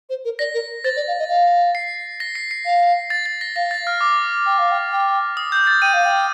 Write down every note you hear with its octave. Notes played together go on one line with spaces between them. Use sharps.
C5
A#4
D5 A#6
A#4
C5 A6
D5
F5
D#5
F5
C7
A#6
C7
C7
F5
A6
A6
A#6
F5 A#6
A6
F6
D6
G5
F5
G5
G5
D#6
G6
A6
G5 D#7
F5
G5